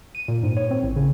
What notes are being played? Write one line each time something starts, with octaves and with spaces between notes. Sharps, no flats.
D#7
A#2
G#2
C#5
C4
A1
C#3